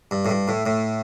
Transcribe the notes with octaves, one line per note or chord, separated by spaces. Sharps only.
G2
A2
G2
A2
A2